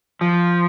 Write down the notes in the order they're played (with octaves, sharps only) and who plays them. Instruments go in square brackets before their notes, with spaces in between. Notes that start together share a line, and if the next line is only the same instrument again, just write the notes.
[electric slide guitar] F3